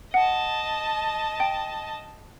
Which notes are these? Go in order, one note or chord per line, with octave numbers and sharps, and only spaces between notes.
D#5 F#5 A5
G5